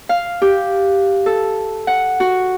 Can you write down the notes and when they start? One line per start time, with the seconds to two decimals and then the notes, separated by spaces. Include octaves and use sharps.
0.09 F5
0.42 G4
1.26 A4
1.87 F#5
2.20 F#4